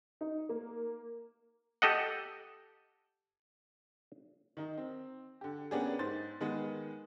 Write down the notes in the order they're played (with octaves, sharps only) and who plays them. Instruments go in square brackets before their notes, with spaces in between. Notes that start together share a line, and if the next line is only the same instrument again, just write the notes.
[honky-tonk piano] D#4
A#3
[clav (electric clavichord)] G4 A4 D#5 F#5
[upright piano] D#3 D#4
C4
D3 G4
A#3 B3 C#4 D4 G4 G#4
G#2 C5 A6
D#3 G#3 B3